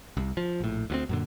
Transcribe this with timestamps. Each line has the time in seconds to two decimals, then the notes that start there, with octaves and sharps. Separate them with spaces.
0.17 C2
0.37 F3
0.60 A#1 A2
0.90 D2 F3 C4
1.09 F#2 A#2 D3